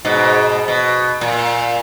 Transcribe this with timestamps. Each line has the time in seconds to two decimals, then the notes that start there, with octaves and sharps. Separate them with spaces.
0.05 G#2 B2
0.68 B2
1.21 A#2